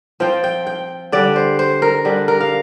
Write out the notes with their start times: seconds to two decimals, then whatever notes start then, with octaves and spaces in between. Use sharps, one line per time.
0.20 F3 C4 F4 G5
0.44 G5
0.67 G5
1.12 D3 G3 D4 D5
1.36 C5
1.59 C5
1.82 A#4
2.05 D3 G3 D4
2.28 A#4
2.41 F5